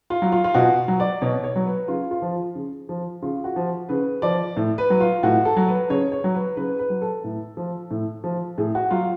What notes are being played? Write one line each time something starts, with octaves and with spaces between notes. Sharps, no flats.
F4
F#3
F4
F4
B2 F#4
F#3
D5
B2 C#5
C#5
F#3
B4
C#3 F4
F4
F3
C#3
F3
C#3 F4
F#4
F3
C#3 B4
F3 D5
A2
B4
F#3
F4
A2 F#4
A4
F#3
B4
C#3 C#5
C#5
F#3
B4
C#3 B4
B4
F#3
A4
A2
F3
A2
F3
A2 G#4
F#4
F#3 F4